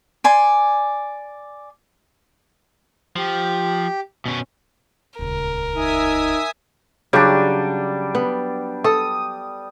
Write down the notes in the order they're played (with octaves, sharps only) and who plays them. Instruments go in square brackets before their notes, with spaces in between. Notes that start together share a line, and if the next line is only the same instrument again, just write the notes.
[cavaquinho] D5 G#5 C6
[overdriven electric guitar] F3 [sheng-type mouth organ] G4
[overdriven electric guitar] B2 C#4
[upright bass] D#1 C#2 [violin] A#4
[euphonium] D#4 [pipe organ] E5 G#5 D#6
[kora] C#3 F#3 G4 [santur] G3 D4
[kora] B3
[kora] A4 [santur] D#6